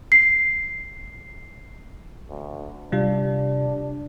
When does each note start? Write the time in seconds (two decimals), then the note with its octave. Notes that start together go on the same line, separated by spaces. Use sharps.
0.12 C7
2.29 D2
2.92 C3 G3 D4 F4